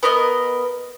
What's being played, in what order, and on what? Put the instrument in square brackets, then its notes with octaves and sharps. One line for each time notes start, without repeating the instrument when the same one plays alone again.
[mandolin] B3 A#4 D#5